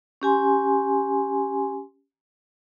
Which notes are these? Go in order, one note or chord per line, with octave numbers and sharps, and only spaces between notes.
C#4 G4 G#5 C6